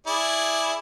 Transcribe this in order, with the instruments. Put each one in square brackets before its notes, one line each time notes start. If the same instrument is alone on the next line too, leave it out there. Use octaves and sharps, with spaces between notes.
[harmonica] E4 G#4 D5